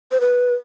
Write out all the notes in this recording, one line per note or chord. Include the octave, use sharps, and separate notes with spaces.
C5
B4